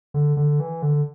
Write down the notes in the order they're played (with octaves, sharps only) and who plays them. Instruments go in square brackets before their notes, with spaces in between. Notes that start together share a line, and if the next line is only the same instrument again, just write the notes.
[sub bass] D3
D3
E3
D3